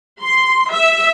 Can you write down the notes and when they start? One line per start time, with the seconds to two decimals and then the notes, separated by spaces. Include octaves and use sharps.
0.23 C6
0.72 E5